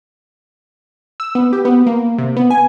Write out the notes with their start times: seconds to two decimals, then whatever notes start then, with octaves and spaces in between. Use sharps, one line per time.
1.20 E6
1.35 B3
1.53 G4
1.65 B3
1.86 A#3
2.18 C3
2.37 B3
2.50 G#5